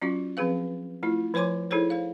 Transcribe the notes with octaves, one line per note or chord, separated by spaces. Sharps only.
F#3 C#4 F4 F#4
F3 C4 G#4 B4 F5
A3 E4 F4
F3 C5 C#5 G#5 C6 D6
D#4 E4 G#4 A4 C5 C#5
C5 F5